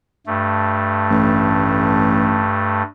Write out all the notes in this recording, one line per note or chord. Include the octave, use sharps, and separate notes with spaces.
G2 A3
A1